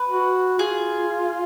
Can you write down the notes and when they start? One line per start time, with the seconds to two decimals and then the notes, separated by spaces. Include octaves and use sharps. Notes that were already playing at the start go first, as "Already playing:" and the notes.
Already playing: B4
0.09 F#4
0.59 F4 G#4